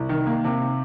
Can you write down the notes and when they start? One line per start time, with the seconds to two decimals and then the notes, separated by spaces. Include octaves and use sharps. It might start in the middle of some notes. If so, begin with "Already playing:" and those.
Already playing: C2
0.09 D#3
0.27 A#3
0.44 C3